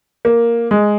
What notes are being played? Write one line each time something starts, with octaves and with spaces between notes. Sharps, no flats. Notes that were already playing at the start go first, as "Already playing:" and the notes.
A#3
G#3